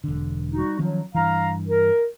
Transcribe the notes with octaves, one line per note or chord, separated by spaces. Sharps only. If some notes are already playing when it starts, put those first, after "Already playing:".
E1 D3
G3 D#4 F#4
D#3 F3 F#3 C#4
G2 E3 F5 A#5
A#4